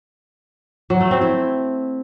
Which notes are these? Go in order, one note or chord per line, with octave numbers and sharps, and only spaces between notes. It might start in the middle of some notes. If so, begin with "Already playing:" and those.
F#3
A3
C4
E4